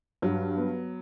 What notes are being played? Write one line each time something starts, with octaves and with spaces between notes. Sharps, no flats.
G2 F#3
B3